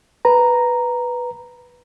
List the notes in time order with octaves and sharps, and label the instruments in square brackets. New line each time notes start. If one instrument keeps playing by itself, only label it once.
[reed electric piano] B4 A#5